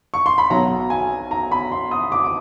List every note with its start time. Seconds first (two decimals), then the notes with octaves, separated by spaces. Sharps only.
0.14 C#6
0.26 C6
0.38 B5
0.50 B1 B2 F#3 A#5
0.90 G#5
1.31 A#5
1.52 B5
1.72 C6
1.91 D#6
2.12 D6
2.25 D6